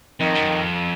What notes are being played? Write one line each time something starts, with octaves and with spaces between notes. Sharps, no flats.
F2 D#3
F#2
F2